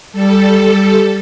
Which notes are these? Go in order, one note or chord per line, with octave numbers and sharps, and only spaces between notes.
G3 A4